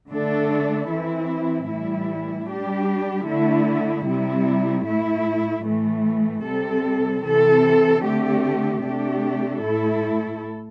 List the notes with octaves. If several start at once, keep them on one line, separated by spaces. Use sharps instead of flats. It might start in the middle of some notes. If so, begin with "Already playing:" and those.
D3 A3 D4 A4
E3 C4 E4
A2 E3 G3 E4
G3 D4 G4
D3 A3 E4
C3 G3 E4
A2 A3 E4
A2 E3 A3
C3 G3 C4 A4
C3 E3 C4 A4
D3 A3 C4 G4
C3 A3 D4 G4
A2 A3 E4 A4